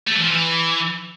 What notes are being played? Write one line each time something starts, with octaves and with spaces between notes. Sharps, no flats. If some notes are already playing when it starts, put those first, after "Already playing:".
A3
E3
F3
E3